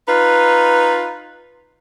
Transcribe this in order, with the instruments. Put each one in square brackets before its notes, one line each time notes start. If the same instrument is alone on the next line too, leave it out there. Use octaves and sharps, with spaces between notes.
[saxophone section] D#4 F4 B4